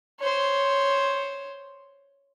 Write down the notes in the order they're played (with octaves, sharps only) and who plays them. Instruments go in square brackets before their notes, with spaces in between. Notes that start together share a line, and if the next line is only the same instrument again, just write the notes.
[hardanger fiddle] C5 C#5